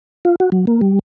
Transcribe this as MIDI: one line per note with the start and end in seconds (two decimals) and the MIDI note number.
0.25 0.36 65
0.40 0.50 66
0.52 0.65 54
0.67 0.81 58
0.81 0.99 55